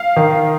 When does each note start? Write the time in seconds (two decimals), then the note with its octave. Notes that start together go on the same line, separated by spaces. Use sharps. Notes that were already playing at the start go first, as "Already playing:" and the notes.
Already playing: F5
0.16 D#3